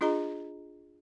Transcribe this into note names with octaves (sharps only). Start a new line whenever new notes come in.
D4 F4 G#4 D#5 A#5